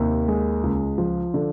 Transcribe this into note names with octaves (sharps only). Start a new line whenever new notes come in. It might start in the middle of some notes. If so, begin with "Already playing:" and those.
Already playing: D#2 C3
G#3
C#2
F3
D3